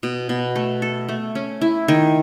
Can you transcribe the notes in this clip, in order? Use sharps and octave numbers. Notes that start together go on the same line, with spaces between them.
B2
B2
A3
A4
A3
C#4
E4
D#3